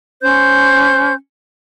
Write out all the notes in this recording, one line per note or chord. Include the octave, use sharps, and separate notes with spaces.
C#4 C5 G6